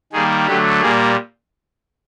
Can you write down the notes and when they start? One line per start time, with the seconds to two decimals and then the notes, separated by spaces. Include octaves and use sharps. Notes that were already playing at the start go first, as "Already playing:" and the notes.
0.13 D#3 G3 A#3 G#4
0.47 D3 F#3 A3 G4
0.81 A#2 G3 A#3 G#4